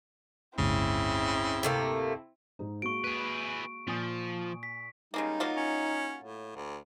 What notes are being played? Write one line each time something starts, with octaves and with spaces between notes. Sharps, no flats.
G1 D2 A2 C#3 C4 E4
C3 A3 A#3
G#2 D#4
G#3 A#3 F#4 C#6 D7
G#4 B4
A#2 F3 G#5 D#6
B6
C#3 G3 G#3 A#3 D#4
F#3 A#3 F4
C#4
A2
D2